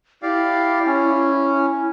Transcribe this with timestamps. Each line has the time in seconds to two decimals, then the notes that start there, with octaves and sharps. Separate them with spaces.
0.23 E4 G4 D5 F5
0.86 C#4